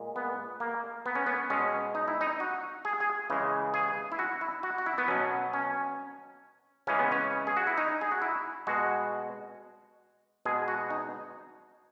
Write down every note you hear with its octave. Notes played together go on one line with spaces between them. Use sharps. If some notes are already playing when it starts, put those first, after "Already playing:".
Already playing: A#2 G#3
B3
A#3
B3
C#4
B3
B2 G#3 C#4
D#4
E4
D#4
F#4
G#4
G#4
C#3 E3 G#3
G#4
E4
F#4
E4
F#4
F#4
E4
B3
B2 F#3 C#4
C#4
C#3 E3 G#3 C#4
B3
C#4
G#4
F#4
E4
D#4
G#4
F#4
E4
B2 G#3 F#4
B2 G#3 G#4
F#4
D#4